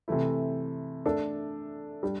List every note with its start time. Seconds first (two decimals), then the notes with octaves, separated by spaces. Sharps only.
0.08 C3 E3 A3 E4
1.06 A3 D4 A4
2.03 G3 D4